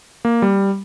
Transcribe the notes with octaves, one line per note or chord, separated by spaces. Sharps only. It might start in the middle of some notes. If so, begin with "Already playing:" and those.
A#3
G3